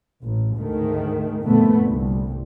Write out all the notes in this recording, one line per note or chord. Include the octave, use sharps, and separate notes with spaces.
A1
D2 G#2 D#3 A3
G1 F2 A#2 D3 A3 B3
C2